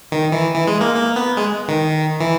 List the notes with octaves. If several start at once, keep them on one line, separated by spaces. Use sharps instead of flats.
D#3
E3
E3
G#3
A#3
A#3
B3
G#3
D#3
E3